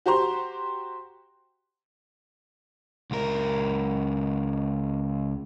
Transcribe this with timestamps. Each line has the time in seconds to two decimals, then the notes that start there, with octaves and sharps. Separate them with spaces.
0.06 F#4 G4 C5 A#5 C6
3.11 C#2 A#4